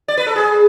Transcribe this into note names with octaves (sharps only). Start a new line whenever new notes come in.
D5
B4
A4
G#4